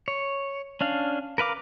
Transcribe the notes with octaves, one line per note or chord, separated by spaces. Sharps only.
C#5
C#4 D4 F5
A#4 B4 F5 D6